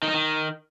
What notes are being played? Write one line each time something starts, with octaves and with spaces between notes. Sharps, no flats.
D#3
D#4
D#3